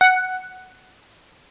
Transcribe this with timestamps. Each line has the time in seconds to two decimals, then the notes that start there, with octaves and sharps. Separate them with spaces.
0.01 F#5